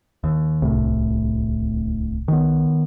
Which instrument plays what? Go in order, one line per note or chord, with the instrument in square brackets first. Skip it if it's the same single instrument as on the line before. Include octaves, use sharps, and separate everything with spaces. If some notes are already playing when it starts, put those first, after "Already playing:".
[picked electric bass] D#2
[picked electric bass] D1 A2 [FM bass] C2
[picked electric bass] D#3 B3